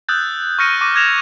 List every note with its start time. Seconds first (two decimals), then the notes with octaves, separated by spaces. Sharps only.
0.09 D#6 E6 F#6 G6 A6
0.58 C#6 F6 F#6 A#6 C#7 D#7
0.81 C#6 D6 A#6 D#7
0.94 D6 G6 G#6 A#6 E7 F7